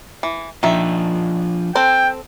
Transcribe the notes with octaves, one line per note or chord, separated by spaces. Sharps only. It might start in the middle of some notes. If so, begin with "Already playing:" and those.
E3
D#3 F3 D4 F4 E5
C4 A4 C5 G5